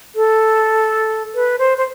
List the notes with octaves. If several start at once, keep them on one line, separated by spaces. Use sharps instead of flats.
A4
B4
C5
C5